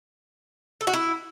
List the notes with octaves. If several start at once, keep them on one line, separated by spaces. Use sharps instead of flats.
A4
F#4
E4